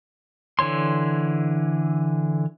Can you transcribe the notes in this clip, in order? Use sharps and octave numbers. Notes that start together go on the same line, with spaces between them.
D3 E3 C#5 C6